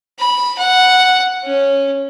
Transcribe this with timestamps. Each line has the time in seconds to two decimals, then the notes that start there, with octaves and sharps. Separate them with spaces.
0.19 B5
0.58 F#5
1.44 C#4